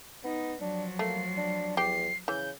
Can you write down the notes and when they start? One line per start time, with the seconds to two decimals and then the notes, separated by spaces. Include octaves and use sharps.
0.24 B3 D#4
0.61 F3 F#3 D4
0.99 A3 A#3 C7
1.37 D4
1.77 E2 G4 C7
2.28 C#3 E3 G6